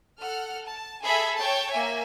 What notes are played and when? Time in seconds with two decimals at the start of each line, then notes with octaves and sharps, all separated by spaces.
0.20 A4 F#5 F6
0.67 A5
1.04 G#4 A4 E5 G#5 B5
1.37 C#5 G5 A5
1.71 A#3 E5 G#5